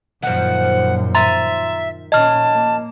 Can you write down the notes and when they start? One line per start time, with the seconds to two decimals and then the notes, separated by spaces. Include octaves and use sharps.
0.22 F#2 A#2 D#3 F3 F#5
1.15 E5 A#5 C6 A6
2.12 A#2 C#4 D#5 A5 F6
2.53 A#3